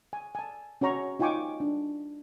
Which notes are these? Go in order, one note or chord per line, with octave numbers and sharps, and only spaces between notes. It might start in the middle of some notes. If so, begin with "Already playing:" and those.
G#5
G#5 A5
C#4 F#4 C#5 A#5 C#6
D#4 F4 G5 G#5 C#6 D6
D4